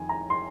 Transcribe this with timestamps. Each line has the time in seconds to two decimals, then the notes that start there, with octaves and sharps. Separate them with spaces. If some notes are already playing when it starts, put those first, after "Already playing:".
Already playing: F2 D#3 G#5
0.09 A#5
0.30 C6